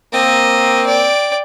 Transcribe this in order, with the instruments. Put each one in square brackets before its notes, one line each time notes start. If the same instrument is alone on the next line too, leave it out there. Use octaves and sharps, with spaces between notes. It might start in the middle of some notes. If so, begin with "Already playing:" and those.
[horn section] A#3 C4 [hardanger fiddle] D#5
[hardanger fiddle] D5 G5